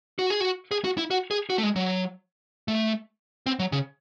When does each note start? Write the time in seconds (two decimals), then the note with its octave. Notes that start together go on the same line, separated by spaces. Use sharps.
0.19 F#4
0.30 G#4
0.40 F#4
0.71 G#4
0.84 F#4
0.98 E4
1.11 F#4
1.31 G#4
1.50 F#4
1.58 A3
1.63 G#3
1.76 F#3
2.68 A3
3.46 C4
3.59 F#3
3.72 C#3